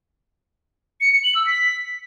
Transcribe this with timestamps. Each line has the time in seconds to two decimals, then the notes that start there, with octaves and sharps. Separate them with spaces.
1.01 C#7
1.12 C#7
1.24 F#7
1.35 E6
1.46 B6